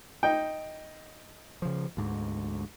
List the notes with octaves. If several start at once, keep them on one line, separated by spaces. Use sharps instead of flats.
D#4 G5
C#3 F3
D2 G#2